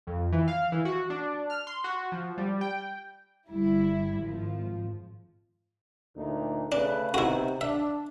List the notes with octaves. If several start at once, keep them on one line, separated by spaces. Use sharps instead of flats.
F2
E3
F5
E3
F#4
D4
F6
C6
F#4
F3
G3
G5
G1 G3 E4
G#1 F3
D2 A#2 D#4
C#3 A3 D4 B4
C3 B3 D#4 E4 F#4
D4 E5